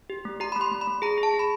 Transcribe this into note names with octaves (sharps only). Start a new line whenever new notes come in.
G4
A3
G4 A#5
B5
A3
C6
A3
B5
A3
G#4 A#5
G#4
A5
G#4
B5